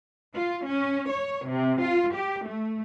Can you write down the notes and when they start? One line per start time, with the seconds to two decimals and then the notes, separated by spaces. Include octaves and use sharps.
0.37 F4
0.66 C#4
1.10 C#5
1.47 C3
1.82 F4
2.16 G4
2.46 A3